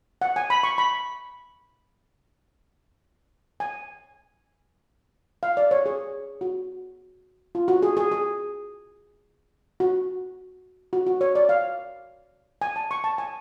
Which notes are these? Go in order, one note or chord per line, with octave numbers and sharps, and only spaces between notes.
F#5
G#5
B5
C#6
B5
G#5
F5
D5
C#5
G#4
F#4
F4
F#4
G#4
G#4
G#4
F#4
F#4
F#4
C#5
D5
F5
G#5
A5
C#6
A5
G#5